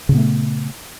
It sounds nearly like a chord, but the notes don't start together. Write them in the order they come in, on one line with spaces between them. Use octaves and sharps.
C#3 A#2 B3 A3